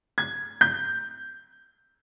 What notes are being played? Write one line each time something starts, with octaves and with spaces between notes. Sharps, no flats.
G#6
G6